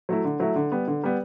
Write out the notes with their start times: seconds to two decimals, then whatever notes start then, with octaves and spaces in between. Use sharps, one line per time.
0.09 F#3 A3 E4
0.24 D3
0.40 F#3 A3 E4
0.56 D3
0.72 G3 B3
0.88 D3
1.04 G3 B3